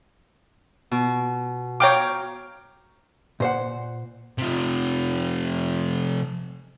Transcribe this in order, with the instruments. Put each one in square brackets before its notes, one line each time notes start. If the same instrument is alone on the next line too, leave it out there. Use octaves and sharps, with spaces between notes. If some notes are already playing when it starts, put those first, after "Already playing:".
[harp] B2
[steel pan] C#5 G5 D6 [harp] F5 A#5
[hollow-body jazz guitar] A#2 C5 F#5
[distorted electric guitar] C3 F3